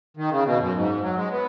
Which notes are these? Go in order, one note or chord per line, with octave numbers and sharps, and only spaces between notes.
D#3
C#3
B2
F#2
G#2
F#3
G#3
B3